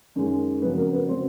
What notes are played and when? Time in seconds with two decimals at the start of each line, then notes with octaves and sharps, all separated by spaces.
0.16 F#2 D#3 G#3
0.62 F2 C#3 F#3 B3 B4
0.78 A#3 A#4
0.93 B3 B4
1.08 C#3 F#3 C4 C5